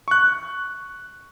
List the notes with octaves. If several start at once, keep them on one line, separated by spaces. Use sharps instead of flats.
C#6 F#6